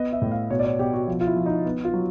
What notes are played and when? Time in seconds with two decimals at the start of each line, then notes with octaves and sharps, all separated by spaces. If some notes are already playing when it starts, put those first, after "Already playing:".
Already playing: B3 D#5
0.13 E5
0.22 A2
0.31 F5
0.50 B2 C#5
0.59 D5
0.65 C#5
0.79 B2 G4
0.94 F#4
1.08 F3
1.21 F4
1.27 E4
1.36 F3
1.46 D#4
1.65 B3
1.84 F4
1.94 F#3